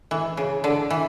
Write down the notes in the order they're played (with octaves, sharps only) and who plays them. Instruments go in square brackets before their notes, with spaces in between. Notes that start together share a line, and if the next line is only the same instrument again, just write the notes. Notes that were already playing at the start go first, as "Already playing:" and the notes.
[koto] E3
C#3
D3
E3